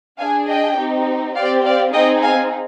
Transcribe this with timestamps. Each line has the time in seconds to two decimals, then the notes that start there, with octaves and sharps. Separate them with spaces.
0.19 D4 G#4 F5 G#5
0.48 D#5 G5
0.78 C4 D#4 G4
1.35 C4 G4 D5 F5
1.64 D5 F5
1.93 C4 D#4 G#4 D#5 G5
2.22 F5 G#5